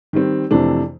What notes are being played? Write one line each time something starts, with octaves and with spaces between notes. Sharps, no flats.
D#3 G3 C4
F2 C3 E3 A3 D4